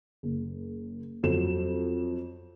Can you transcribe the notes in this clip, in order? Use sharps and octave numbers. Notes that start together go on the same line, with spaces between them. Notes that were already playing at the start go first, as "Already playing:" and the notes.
F#1
F2 F#3 E7